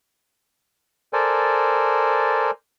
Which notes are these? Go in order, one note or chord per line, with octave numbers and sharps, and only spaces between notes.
A4 A#4 C5 D5 G#5